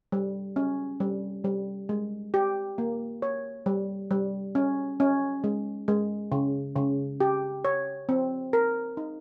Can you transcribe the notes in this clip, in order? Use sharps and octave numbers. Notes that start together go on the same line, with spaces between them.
G3
C#4
G3
G3
G#3
G4
A#3
C#5
G3
G3
C#4
C#4
G#3
G#3
C#3
C#3
G4
C#5
C4
A#4
D#4